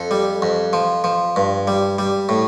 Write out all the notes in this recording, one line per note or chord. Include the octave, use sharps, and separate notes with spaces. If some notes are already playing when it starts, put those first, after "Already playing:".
Already playing: F2 A4
G3
F2
F3
F3
G2
G3
G3
A2